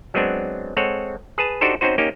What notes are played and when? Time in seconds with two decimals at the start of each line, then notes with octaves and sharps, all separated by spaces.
0.14 F#3 G#3 B3 C4 D4
0.77 G#3 C4 A4 C#5 F#5
1.38 G#4 B4 A5
1.61 D4 D#4 F#4 G4 A4 C5
1.81 C4 C#4 D#4 F#4 C5
1.98 A#3 C#4 D#4 G4